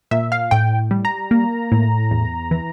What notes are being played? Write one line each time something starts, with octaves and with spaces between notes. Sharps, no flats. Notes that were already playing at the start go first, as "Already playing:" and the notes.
A#2 E5
F5
A2 G5
G3
A#5
A#3
A2
E2
E3